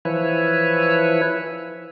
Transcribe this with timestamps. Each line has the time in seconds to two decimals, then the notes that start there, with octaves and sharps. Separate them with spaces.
0.05 E3 F3 E4 B4 C#5